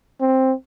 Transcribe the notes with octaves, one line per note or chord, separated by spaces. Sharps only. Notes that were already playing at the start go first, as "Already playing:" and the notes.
C4